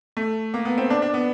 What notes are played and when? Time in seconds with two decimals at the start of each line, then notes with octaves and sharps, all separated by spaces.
0.17 A3
0.54 A#3
0.65 B3
0.78 C4
0.90 D4
1.02 D4
1.14 B3